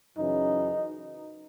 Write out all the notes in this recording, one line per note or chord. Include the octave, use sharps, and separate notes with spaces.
F#2 C#3 E3 D#4